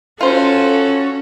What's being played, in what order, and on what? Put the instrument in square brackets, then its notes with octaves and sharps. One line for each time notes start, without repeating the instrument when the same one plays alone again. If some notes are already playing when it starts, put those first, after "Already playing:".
[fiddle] C#4 [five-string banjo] F4 C5 [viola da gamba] F#4 A4